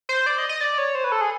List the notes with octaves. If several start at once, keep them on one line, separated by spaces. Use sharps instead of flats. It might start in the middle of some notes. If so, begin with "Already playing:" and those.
C5
D5
D#5
D#5
D5
C#5
C5
B4
A4
G#4